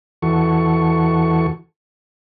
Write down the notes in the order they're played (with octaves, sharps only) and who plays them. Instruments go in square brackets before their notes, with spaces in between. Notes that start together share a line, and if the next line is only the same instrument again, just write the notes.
[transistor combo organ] E2 E3 F#4 A4 C#6